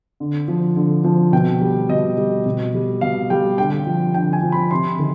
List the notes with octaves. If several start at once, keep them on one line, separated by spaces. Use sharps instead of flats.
D3
F3
D3
F3
B2 G5
G3
B2 D#5
G3
B2
G3
B2 F5
G3 G5
D3 G5
F3
D3 G5
G#5
F3
B5
C3 C6
D#3